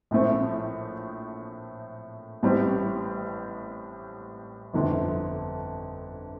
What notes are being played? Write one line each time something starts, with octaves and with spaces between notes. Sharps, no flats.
A#1 A2 A3 C4
A1 A2 G3 C4
G1 F2 D3 A3